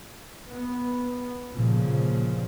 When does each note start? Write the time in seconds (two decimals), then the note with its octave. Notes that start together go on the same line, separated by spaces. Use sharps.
0.49 B3
1.52 G1 A#2 C#3 F3